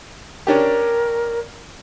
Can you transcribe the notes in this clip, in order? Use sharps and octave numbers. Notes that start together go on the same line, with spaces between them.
C#4 D4 G4 A#4